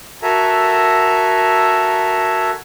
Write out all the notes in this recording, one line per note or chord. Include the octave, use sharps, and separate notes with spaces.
F#4 A4 A#4 E5 G#5 A#5